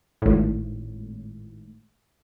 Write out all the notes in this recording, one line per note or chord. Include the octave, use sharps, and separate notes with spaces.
G#1 A2